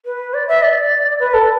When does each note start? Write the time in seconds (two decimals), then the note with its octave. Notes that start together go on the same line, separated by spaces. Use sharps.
0.05 B4
0.34 D5
0.48 E5
0.62 D5
1.19 B4
1.33 A4